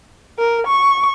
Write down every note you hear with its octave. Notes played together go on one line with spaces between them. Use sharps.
A#4
C#6